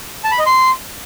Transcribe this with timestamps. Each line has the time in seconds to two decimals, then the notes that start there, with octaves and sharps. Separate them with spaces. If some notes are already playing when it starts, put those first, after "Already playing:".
0.24 A5
0.32 B5
0.39 D#5
0.46 C6